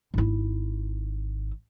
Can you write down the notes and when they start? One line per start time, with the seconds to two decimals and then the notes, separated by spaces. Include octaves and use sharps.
0.14 G#1 E4